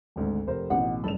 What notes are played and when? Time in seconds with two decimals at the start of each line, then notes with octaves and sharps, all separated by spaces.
0.16 G#1 D2 G#2
0.47 F1 A#4 C5
0.70 A1 B2 D#4 F#5
1.04 F#1 G2 D#4 A4 B5 F7